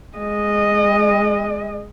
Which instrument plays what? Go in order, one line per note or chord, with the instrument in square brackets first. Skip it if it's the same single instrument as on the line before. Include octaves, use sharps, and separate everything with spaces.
[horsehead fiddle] G#3 D#5